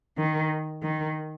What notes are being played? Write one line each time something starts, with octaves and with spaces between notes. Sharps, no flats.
D#3
D#3